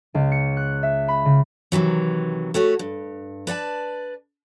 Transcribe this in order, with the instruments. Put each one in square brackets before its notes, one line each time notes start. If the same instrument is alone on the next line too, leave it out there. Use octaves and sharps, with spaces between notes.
[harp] C#2
C#7
F#6
E5
B5
C#3
[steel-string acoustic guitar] C3 D#3 E3 F#3
A3 F#4 G4 C#5
G2
B4 D5 F#5 A5